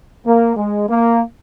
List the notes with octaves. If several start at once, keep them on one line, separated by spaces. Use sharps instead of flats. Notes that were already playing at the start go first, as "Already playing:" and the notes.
A#3
G#3
A#3